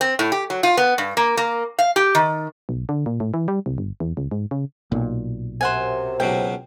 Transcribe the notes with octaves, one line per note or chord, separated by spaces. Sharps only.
C4
A2
G4
F#3
F4
B3
G2
A#3
A#3
F5
G4
D#3
B1
D3
A#2
A2
E3
G3
C2
G1
E2
C#2
G#2
C#3
B1 A#2
F#2 C3 C5 F#5 G#5
C#2 B2 F#3 G5